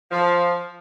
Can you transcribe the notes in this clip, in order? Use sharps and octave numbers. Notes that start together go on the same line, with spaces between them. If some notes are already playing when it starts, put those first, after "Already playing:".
F3